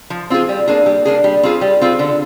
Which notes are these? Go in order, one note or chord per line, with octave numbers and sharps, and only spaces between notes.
F3
C4 F4 G#4
G3
A#3 D4 G#4
G3
A#3 D4 G#4
G3
C4 F4 G#4
G3
C4 F4 G#4
D3